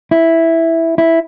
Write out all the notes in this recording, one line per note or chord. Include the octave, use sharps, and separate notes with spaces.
E4
E4